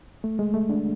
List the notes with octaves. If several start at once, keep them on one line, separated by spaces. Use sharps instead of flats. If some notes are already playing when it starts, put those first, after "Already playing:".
A3
G#3
A3
D4